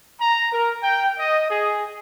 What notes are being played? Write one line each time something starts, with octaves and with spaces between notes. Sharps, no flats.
A#5
A#4
G5
D#5
G#4